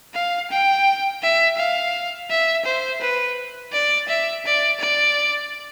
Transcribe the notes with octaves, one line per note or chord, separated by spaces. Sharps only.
F5
G5
E5
F5
E5
C5
B4
D5
E5
D5
D5